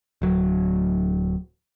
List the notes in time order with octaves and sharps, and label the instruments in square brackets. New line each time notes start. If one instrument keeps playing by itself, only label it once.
[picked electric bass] D1 F#3